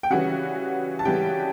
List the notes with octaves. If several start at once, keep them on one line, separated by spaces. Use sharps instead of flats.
G5
C#3 E3 G3 C#4 F#4 F#5
A5
C#3 E3 G3 C#4 G4 G5